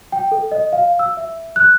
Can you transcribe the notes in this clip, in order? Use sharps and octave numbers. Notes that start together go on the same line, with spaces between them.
G5
A4
D#5
F5
E6
E5
F#6